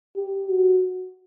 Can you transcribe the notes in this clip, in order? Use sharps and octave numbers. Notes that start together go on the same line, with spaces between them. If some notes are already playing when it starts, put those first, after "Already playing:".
G4
F#4